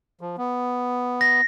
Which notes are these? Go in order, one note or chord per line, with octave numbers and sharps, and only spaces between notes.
F3
B3
A#6